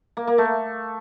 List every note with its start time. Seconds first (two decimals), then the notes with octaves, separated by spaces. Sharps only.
0.17 A#3
0.27 A#3
0.38 A3